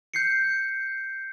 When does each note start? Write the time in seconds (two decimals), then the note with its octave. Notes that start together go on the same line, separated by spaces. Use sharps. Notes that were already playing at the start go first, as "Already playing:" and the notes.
0.14 G6 C7 C#7